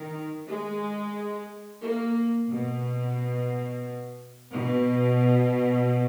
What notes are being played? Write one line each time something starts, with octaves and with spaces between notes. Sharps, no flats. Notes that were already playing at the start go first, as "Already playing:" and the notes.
Already playing: D#3
G#3
A#3
B2
B2